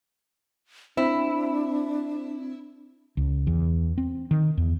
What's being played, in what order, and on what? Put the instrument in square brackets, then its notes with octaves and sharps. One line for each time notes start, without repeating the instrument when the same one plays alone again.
[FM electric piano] C4 [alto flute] D4 [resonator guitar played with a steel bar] E4
[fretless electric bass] C#2
E2
C4
D#3
E2